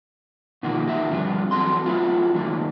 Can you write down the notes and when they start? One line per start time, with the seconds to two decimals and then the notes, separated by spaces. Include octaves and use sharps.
0.63 B2 D#3 F3 A#3 F#4
0.87 A#2 D#3 F#4 A#4 E5
1.11 G2 D3 F3 C4 D4 F4
1.51 E2 F#3 C4 F#4 A4 C6
1.86 F#3 A3 B3 E4 F4
2.34 C#2 F#2 D#3 A3 A#3